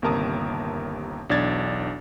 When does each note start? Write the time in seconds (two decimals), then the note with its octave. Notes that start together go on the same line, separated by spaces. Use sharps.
0.02 G1 D#2 C3 A#4 A5 D#6
1.30 B1 E2 D4 D5 G#6 A6